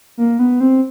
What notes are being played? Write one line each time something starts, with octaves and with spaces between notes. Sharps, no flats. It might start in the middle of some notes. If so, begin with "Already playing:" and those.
A#3
B3
C4